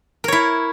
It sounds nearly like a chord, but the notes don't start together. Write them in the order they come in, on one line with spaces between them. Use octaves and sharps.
A#4 C#5 E4